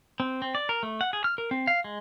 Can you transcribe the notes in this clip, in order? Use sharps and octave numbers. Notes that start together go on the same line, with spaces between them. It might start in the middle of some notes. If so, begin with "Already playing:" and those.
C4
C4
D5
A#4
A3
F#5
G#4
F6
A#4
C4
F5
G#3